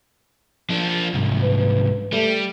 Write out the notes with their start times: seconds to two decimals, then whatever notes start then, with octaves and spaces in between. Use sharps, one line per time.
0.70 F3 D4
1.14 C2 G#2
1.43 B4
2.13 G3 A3